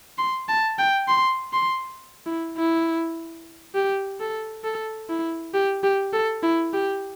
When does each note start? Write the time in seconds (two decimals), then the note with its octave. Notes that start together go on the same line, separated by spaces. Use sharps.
0.18 C6
0.49 A5
0.78 G5
1.08 C6
1.53 C6
2.26 E4
2.57 E4
3.75 G4
4.20 A4
4.64 A4
5.09 E4
5.54 G4
5.83 G4
6.13 A4
6.43 E4
6.73 G4